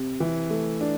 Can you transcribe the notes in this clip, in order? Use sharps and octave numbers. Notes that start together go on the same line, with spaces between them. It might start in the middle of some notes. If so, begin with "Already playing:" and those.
Already playing: C3
E3
A3
D4